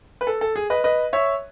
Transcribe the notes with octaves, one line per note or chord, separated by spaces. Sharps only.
B4
A4
A4
G#4
B4 D#5
B4 D#5
C#5 E5